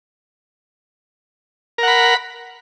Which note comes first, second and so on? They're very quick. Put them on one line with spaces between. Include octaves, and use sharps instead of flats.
A#4 F#5 B5